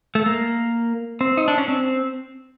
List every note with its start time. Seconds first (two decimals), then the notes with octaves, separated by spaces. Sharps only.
0.15 A3
0.26 A#3
1.21 C4
1.37 D#4
1.48 D4
1.58 C#4
1.68 C4